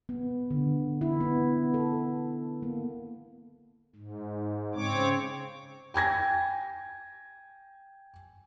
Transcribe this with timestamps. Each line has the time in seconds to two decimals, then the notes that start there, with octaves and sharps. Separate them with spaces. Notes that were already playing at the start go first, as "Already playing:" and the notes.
0.09 B3
0.51 D3
1.01 E4
1.20 B3
1.74 A4
2.62 A#3
3.96 G#2
4.75 C#3 C4 C#5 D6
5.94 G5 G#5 G#6 A#6